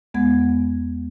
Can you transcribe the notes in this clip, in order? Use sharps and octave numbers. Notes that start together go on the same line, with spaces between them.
E2 G#3 B3 F#5 G#6